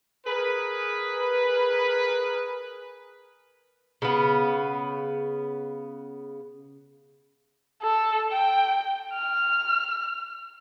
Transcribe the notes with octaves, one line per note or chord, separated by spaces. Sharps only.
G#4 A#4 B4
C#3 B3
A4
G5
F6